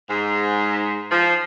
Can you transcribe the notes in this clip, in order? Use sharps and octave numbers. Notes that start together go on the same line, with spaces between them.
G#2
F3